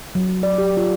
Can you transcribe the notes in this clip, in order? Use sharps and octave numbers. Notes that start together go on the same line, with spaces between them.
F#3
D5
G4
F4